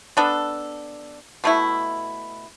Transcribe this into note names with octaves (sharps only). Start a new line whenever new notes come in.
B3 D4 A4
B2 A3 E4